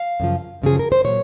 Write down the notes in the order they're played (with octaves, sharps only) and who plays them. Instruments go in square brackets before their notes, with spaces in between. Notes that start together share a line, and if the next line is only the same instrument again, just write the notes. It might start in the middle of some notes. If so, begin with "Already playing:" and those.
Already playing: [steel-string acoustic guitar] F5
F#2 C#3 F3
F#2 C#3 F3 G#4
A#4
C5
A#2 F#3 C#5